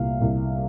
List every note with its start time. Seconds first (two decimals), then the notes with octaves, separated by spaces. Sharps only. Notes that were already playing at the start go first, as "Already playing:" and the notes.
Already playing: C2 A#2 F5
0.21 C2